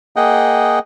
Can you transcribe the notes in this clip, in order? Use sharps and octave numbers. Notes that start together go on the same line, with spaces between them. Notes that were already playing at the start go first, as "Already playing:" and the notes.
A#3 G#4 D#5 F#5 G5